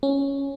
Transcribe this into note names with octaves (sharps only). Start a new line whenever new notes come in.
C#4